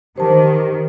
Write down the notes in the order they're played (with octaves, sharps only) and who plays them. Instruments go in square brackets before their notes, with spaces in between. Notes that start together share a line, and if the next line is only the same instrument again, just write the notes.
[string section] D#3 [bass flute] G4 [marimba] C5 A5